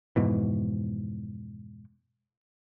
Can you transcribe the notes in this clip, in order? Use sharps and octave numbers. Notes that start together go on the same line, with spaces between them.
F2 G#2 B2 E3